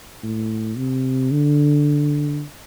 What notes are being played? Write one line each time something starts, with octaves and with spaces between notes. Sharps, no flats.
A2
C3
D3